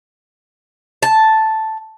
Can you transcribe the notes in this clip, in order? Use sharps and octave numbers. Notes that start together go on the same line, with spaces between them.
A5